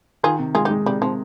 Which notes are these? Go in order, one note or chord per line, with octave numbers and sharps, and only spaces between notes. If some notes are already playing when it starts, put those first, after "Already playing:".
D#3 F4 G#4
C3
G#3 F4 G#4
D#4 G4
G#3
C3 G3
C3 F3